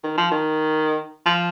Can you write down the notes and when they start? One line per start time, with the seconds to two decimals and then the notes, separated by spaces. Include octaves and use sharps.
0.04 D#3
0.17 F3
0.31 D#3
1.26 F3